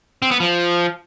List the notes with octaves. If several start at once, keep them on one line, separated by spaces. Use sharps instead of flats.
C4
B3
F3